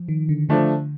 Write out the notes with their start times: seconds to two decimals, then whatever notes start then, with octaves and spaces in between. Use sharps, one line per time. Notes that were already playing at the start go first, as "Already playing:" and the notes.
Already playing: F3
0.08 D#3
0.29 D3
0.49 D3 F3 A3 D4